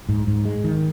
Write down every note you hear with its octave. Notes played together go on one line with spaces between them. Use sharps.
G#2
G#2
G#3
D#3